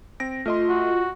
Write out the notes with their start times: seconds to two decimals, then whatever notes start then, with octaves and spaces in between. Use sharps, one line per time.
0.20 C4 A#6 D7
0.46 A3 F4 D#5 C6
0.69 F#4